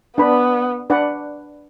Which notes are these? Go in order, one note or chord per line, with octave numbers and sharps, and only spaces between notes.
B3 D4 B4 D5 B5
D4 B4 D5 F#5